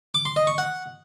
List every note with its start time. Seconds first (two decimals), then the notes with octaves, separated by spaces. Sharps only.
0.15 D6
0.25 C6
0.36 D#5
0.47 C#6
0.58 F#5